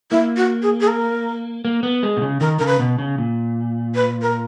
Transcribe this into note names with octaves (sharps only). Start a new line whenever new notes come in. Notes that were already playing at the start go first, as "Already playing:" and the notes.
A#3 E4
F#4
G#4
G#4
A#4
A#3
B3
G#3
B2
C#3
D#3 A#4
C#3 A#4
B4
B2
C#3
A#2
B4
A#4